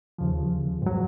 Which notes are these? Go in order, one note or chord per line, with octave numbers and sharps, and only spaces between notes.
D#2 C#3 F3
G#2 F#3